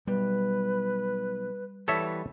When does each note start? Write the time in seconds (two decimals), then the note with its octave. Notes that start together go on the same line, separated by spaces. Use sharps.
0.07 B1 G3 B4
1.88 E3 G3 B3 A4 C#5 E5